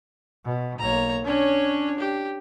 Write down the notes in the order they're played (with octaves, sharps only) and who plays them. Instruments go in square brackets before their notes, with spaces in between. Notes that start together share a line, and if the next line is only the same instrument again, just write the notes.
[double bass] B2
[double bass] B1 A#3 [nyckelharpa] C#5 A#5
[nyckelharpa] C#4 C#5 [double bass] D4
[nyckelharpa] G4